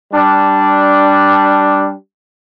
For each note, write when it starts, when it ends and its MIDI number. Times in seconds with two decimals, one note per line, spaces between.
0.13 1.94 55
0.13 1.94 62